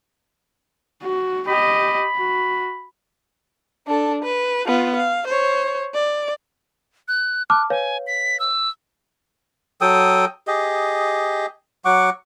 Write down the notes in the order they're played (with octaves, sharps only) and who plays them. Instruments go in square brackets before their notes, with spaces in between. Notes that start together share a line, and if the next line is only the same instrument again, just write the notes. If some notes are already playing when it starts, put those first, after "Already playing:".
[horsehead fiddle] F#4
[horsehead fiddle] G4 D#5 [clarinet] B5
[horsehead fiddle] F#4
[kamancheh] D4 A4
B4
B3 F4
F5
C5 C#5
D5
[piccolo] F#6
[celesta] A5 D6 F6 [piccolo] F#6
[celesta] B4 C#5 F5 [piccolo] G#5
[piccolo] B6
E6
[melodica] F#3 A4 G5 D#6
G4 G#4 D#5
F#3 F#5 C#6 D6